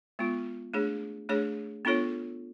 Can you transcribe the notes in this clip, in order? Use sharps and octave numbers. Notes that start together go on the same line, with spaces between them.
G#3 B3 F4
A3 D4 G#4 C#5
A3 D4 G#4 C#5
B3 D4 F4 A4 C#5